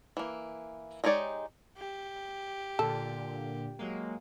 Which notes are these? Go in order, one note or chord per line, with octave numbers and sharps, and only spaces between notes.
E3 A#3
G#3 D#4 G4 C#5 D5
G4
A#2 D3 A4
F#3 G#3 A#3